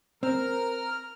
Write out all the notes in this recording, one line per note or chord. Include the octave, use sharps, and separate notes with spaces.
C4 A#4 F6